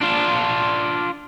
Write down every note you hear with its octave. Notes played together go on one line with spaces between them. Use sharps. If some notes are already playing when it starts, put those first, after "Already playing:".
D4 F4